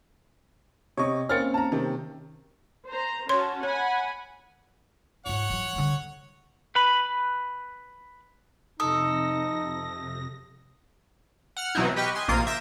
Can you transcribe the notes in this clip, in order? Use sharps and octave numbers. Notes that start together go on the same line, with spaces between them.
C3 C#5 D#5 C#6
A#3 C4 C#4 F6 A6 C#7
A5 A#5
C3 D#3
C5 A#5
C#4 F#4 C#5 A5 C6
C#5 F#5 G#5 B5
G#2 F4 C#5 F#5
E3 F#3
D3 G3
B4 B5
F2 C3 D#4 A4 D#6 A#6
F#5 F6 C#7
B2 E3 F#3 C4 D#4 E4
G4 B4 D#5 G5 C#6 F6
D#5 G#5 C6
A#1 C3 A#3 F4 D#6 C7
E5 G6 A#6 D7